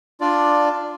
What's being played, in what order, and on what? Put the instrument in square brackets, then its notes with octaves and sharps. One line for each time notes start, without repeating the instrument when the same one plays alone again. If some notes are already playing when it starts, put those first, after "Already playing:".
[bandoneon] D4 F4 D5